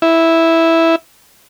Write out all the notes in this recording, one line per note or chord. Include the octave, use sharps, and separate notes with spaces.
E4